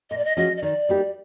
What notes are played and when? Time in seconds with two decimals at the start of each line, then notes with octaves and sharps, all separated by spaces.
0.10 A#2 D#5
0.17 D5
0.25 D#5
0.37 F3 G#3 C#4 F#4 D#5
0.57 D#5
0.62 D#3 D5
0.89 G3 A#3 D#4 G4